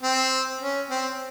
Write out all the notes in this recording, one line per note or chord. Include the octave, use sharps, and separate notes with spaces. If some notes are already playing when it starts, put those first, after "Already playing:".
C4
C#4
C4